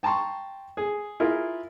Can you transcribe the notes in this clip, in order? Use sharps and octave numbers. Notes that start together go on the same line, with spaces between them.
G5 A5 A#5 C6 C#6
G#4
E4 F4 G#4 A#4